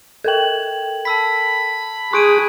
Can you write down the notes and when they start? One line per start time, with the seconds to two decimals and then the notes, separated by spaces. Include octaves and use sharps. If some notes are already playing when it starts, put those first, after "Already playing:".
0.24 A4 A#4 G5 G#6 F#7
1.05 A5 B5 E6 B6
2.13 G#4 C6 C#6 D#6 F#6 D7 D#7